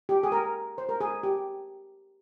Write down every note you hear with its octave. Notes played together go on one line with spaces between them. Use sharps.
G4
G#4
A#4
C5
A#4
G#4
G4